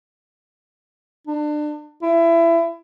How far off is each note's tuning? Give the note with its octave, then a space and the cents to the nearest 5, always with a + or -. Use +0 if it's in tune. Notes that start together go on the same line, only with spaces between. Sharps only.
D4 +30
E4 +25